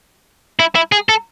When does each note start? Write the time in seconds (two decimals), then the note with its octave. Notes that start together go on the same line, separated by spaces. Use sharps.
0.59 E4
0.75 E4
0.92 G#4
1.09 A4